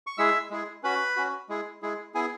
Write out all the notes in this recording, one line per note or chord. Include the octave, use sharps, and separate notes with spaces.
C#6
G#3 E4 G#4 E5 E6
G#3 E4 G#4
C#4 F#4 B4 B5
C#4 F#4
G#3 E4 G#4
G#3 E4 G#4
B3 E4 G#4 G#5